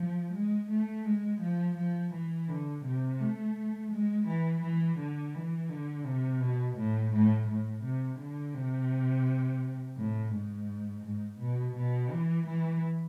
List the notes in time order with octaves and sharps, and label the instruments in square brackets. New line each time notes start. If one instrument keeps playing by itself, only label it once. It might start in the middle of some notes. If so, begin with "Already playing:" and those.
Already playing: [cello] F3
G#3
A3
G#3
F3
F3
E3
D3
C3
A3
G#3
E3
E3
D3
E3
D3
C3
B2
A2
A2
A2
C3
D3
C3
A2
G#2
G#2
B2
B2
E3
E3